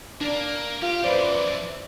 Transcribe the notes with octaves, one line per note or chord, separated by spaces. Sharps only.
A#3 D4
F4 G4
F#2 E3 B4 C5 D5